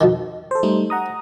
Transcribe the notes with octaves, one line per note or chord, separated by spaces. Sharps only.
F2 B2 D#3
A4 C5
G3 A3 D#4
F#5 A#5 D#6